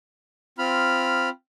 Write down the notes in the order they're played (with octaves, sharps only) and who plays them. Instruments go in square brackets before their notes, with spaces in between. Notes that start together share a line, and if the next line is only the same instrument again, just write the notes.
[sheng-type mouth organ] C4 F4 B5 F6